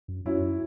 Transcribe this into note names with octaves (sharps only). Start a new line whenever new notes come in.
F#2
F#2 F#3 C#4 E4